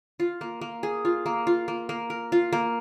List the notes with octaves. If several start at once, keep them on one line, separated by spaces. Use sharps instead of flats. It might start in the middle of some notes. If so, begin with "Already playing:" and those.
F4
A#3
A#3
G#4
F4
A#3
F4
A#3
A#3
A#4
F4
A#3